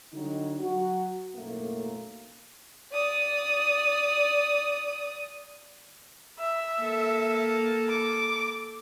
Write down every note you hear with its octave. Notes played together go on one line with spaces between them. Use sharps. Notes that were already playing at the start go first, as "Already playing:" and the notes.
D3 F#3 G3 D#4
F#3 F#4
B1 F#2 A2 A3 A#3
D5 D#6
E5
A#3 A4
D6